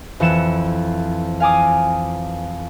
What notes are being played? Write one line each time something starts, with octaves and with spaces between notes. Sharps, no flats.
F2 E3 C#7 E7
F5 G#5 D6 D#6